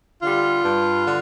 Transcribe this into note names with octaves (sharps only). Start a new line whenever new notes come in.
D3 G3 F4
G2
D3